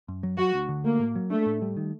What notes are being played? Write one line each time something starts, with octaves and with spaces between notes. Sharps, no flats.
F#2
F#3
F#3 F#4
D2
D3
A3 A#3
A2
F#3
A3 D4
A2
G3
D#3